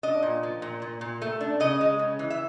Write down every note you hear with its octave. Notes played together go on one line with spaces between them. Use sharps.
D4 D#5
A#2
F3
A#2
A#2
A#2
A3
D4
C#3 D#5
G#3
C#3
E3
E5